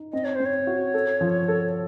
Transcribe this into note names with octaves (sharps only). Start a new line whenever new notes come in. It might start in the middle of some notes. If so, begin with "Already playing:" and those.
Already playing: D#4
C4 D#5
C#5
C4 C5
C#5
F#4
A4
F3
A4